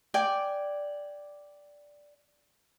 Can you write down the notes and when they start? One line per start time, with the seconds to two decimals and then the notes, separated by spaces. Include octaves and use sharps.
0.14 D5 G5 G#5